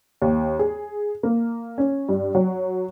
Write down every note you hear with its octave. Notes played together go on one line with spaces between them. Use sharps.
D#2
G#4
A#3
C#4
G2
F#3